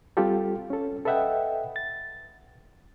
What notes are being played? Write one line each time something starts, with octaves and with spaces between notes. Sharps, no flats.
G3 C4 F4 G4 A4
C#4 A4
A4 B4 D#5 E5 F#5 G5
A6